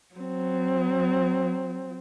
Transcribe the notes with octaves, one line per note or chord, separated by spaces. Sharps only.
F#3 C4